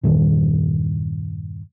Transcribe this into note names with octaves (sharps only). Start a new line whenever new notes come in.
E2 G2 A#2 D#3